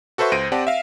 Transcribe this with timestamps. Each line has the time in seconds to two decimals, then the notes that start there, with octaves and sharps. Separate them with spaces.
0.18 F#4 A4 B4 C5 E5 C#6
0.32 C#2 C5 A#6 D7 D#7
0.52 C4 G4 D5 F#5 A5
0.67 E5 F5